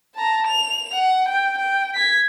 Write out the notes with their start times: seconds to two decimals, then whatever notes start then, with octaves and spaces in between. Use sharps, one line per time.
0.16 A5 A#5
0.47 F7
0.93 F#5
1.28 G5
1.58 G5
1.94 G#6 B6